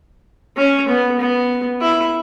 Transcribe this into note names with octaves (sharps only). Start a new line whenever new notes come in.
C#4
B3
B3
E4